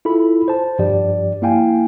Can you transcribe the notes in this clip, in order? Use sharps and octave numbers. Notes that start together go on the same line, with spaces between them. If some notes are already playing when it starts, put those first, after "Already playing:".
E4 F4 A4 B5
C5 A5
G2 F3 G4 D5
A#3 E4 F5 G5 G#5